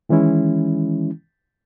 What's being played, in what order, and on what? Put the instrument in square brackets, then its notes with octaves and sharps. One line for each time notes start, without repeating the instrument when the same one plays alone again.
[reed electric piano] D#3 E3 G#3 C#4 E4